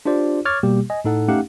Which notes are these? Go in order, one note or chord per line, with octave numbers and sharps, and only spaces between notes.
D4 F4 G4 C5 D5
C#5 C#6 D6 F6 G#6 A6
B2 G3 A#3 G4
D#5 G#5
A2 D#4 A4 F#5
A3 C#4 D#4 G4 F5 F#5